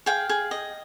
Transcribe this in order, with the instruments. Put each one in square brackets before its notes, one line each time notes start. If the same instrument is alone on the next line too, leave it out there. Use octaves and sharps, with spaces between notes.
[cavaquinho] G#4 F5 G5
G#4
D#5